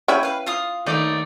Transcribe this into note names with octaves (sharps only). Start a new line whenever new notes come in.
C#4 E4 C#5 G5 G#5 B5
B4 F5
F4 F5 D#6
D#2 A3 D#4 D5